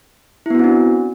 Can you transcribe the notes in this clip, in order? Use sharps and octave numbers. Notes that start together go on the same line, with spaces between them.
B3 C4 D4 E4 F#4